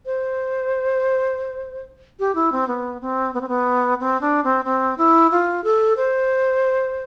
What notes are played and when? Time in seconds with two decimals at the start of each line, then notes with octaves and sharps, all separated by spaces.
0.06 C5
2.19 G4
2.35 E4
2.52 C4
2.68 B3
3.01 C4
3.34 B3
3.41 C4
3.48 B3
4.00 C4
4.21 D4
4.44 C4
4.65 C4
4.98 E4
5.31 F4
5.64 A4
5.97 C5